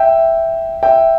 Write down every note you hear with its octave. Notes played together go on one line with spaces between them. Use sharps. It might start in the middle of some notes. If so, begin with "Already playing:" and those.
Already playing: E5 G5
E5 G5